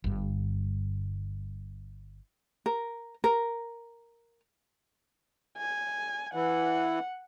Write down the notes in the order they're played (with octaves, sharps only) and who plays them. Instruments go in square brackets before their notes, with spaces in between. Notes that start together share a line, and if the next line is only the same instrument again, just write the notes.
[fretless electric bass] G1 G2
[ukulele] A#4
A#4
[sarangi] G#5
[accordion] E3 [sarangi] F#5